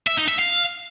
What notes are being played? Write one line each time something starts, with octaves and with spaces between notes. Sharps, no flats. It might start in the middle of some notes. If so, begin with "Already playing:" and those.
E5
D#4
E5
F5